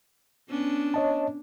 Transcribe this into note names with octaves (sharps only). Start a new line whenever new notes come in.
B3 C#4 D4
C#5 D#5 A5